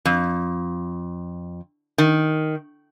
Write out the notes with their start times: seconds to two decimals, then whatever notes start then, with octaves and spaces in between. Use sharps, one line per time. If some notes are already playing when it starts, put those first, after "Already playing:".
0.05 F2
1.98 D#3